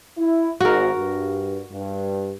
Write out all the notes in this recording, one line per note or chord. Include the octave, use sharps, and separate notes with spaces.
E4
G#1 G#2 F#4 A#4
G2
G2